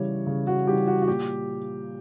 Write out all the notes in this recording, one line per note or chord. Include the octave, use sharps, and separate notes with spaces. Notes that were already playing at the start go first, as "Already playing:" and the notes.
Already playing: C#3 E3 G3 C#5
C#3
F#4
E3 G3 G4
F#4
F#4
A#2 G4